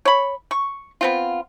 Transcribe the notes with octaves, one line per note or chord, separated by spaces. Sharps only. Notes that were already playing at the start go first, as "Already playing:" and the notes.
C#5 B5
C#6
B3 C4 F4